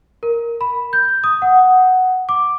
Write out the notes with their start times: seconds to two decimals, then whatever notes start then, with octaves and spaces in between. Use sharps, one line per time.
0.23 A#4
0.61 B5
0.93 G6
1.24 D#6
1.42 F#5
2.29 D6